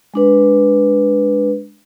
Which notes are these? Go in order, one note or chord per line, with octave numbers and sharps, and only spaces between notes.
G#3 D4 B4